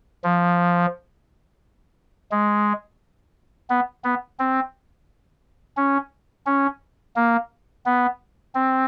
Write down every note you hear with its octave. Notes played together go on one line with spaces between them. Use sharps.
F3
G#3
B3
B3
C4
C#4
C#4
A#3
B3
C4